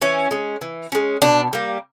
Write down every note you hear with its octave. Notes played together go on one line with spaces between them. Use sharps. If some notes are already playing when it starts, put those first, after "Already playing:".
E3 C#4
G#3 C#4
E3
G#3 C#4
B2 D4
G3 A#3